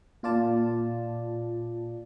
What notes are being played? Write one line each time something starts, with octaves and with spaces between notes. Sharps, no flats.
A#2 F4 D5 A5